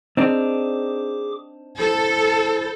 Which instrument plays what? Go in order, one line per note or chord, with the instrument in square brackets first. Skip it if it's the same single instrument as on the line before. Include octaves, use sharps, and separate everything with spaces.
[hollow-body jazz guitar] C4 D4 D#4 [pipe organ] G#4 D6
[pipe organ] E4 C5 [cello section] A4